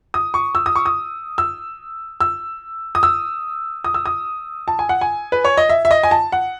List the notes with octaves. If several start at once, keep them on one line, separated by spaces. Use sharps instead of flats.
D#6
C#6
E6
D#6
C#6
D#6
E6
E6
D#6
E6
D#6
E6
D#6
A5
G#5
F#5
G#5
B4
C#5
D#5
E5
E5
D#5
G#5
A5
F#5